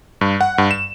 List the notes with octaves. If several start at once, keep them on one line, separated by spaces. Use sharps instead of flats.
G2
F#5
G2
E7